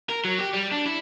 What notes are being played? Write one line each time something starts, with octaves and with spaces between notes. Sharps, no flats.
A#4
F#3
G4
G3
D4
E4